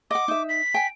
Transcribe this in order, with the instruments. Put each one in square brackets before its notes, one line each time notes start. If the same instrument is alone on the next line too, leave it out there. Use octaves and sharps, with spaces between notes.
[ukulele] D#5 F#5 [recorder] D6
[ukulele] D#4 E5
[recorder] B6
[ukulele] G5 G#5